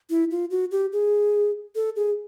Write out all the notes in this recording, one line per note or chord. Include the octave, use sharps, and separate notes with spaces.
E4
F4
F#4
G4
G#4
A4
G#4